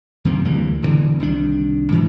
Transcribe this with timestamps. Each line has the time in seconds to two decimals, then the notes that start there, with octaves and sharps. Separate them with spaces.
0.25 F#2 C3 D#3 A#3
0.45 D2 E3 G3 A#3
0.82 E1 D2 D3 E3
1.20 C2 D#3 D4
1.92 G#2 E3